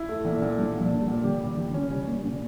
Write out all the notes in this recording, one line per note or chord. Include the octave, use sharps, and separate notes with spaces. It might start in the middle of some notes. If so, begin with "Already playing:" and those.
Already playing: E4
A3
A#2 E3
A#2
G3 D4
A#2
F3
D4
G3
A#2
D3 G4
G3
D3
E3 G4
D3
C#4
C#3 G3
G3 A#3
A#2 D4